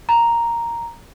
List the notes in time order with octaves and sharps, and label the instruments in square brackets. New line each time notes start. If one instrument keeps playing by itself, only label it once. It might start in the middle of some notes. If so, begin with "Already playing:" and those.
[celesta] A#5